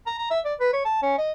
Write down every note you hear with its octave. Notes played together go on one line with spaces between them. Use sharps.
A#5
A#5
E5
D5
B4
C#5
A5
C#4
D#5